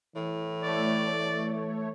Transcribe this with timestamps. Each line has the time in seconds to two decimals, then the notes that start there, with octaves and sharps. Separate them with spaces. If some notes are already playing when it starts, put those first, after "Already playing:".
0.15 A2 E3
0.63 A3 C#5 D5